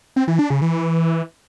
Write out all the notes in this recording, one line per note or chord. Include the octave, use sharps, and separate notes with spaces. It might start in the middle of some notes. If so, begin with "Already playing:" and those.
C4
E3
D4
C#3
E3